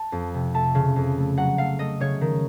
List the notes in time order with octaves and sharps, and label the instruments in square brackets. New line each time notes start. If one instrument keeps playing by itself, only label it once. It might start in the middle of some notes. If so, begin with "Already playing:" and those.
Already playing: [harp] A5
F2
C3
A3 A5
C#3
F2
A3
F#3 F#5
A3 F5
A3 D#5
C#3 C#5
D#3